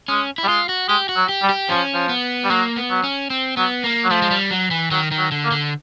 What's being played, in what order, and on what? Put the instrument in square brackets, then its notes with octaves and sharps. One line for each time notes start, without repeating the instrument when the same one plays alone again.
[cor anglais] G#3 [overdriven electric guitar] C#4
[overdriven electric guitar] E4
[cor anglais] G3
[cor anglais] G#3 [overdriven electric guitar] F4
[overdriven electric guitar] F#4
[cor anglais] G#3 [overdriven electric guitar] G4
[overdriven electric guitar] F#4
[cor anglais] F#3
[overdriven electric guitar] G4
[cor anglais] G3
[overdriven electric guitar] G4
[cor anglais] F3 [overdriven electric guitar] C#4
[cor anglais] F3
[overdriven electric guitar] B3
[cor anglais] G3
[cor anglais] F#3 [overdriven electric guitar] A#3
[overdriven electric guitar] B3
[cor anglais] F#3
[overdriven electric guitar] C#4
C4
[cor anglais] F#3 [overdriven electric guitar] B3
[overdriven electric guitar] A#3
[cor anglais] F#3
[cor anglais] F3 [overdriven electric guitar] A3
[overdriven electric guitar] G#3
G3
F#3
E3
[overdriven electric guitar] D#3 [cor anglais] F#3
[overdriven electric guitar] D#3
[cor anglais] F#3
[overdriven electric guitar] D3
[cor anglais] A#3
[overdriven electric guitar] D3